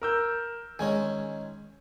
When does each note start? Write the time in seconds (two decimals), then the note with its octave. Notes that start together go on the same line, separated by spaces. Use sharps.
0.02 A#4 E6 G6
0.79 D#3 G#3 C#4 G#5